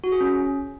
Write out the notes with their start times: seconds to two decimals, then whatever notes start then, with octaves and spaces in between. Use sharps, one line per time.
0.04 F#4
0.12 G#4
0.21 C#4